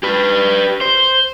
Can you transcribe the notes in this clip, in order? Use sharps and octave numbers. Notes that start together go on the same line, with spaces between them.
G4 B4
C5